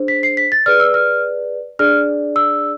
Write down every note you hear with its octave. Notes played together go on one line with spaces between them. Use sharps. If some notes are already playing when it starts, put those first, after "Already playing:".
Already playing: D4 G#4 C5
B6
C7
B6
A6
G#4 B4 D5 F6
E6
F6
D4 G#4 D5 F6
E6